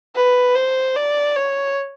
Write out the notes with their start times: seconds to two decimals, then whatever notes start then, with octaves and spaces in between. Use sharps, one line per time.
0.16 B4
0.56 C5
0.96 D5
1.36 C#5